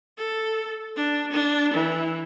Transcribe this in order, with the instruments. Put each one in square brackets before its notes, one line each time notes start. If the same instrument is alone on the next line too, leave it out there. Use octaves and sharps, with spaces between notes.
[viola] A4
D4
D4
E3